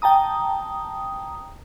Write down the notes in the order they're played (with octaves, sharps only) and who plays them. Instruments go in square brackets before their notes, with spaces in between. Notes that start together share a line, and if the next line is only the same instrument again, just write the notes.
[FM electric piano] G5 A5 A#5 D#6